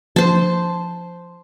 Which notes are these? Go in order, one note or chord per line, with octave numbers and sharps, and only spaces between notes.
F3 C4 D4 C5 A5